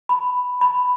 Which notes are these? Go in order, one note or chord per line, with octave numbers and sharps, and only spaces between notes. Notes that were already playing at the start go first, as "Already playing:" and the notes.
B5
B5